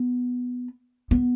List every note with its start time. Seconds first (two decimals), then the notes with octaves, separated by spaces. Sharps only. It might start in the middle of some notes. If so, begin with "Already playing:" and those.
Already playing: B3
1.11 B3